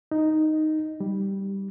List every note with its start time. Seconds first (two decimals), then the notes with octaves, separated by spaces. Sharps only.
0.11 D#4
1.00 G3